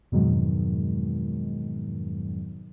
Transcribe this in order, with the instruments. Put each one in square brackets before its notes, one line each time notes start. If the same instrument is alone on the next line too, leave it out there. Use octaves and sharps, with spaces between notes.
[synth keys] F2 G#2 B2 D#3 F#3 G#3